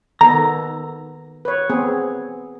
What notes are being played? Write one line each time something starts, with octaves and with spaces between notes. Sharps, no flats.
D#3 B3 A4 A#5
B4 C#5
B3 C4 G#4